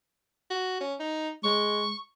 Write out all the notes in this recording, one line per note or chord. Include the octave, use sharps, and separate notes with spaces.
F#4
C#4
D#4
G#3 C#6